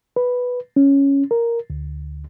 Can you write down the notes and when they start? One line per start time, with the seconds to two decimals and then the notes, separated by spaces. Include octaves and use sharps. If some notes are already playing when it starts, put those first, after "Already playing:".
0.16 B4
0.76 C#4
1.31 A#4
1.70 D2